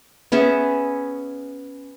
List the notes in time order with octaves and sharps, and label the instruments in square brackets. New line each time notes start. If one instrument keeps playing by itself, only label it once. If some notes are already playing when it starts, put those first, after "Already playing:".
[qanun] B3 C#4 G#4 E5